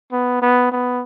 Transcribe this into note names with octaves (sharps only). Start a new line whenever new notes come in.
B3
B3
B3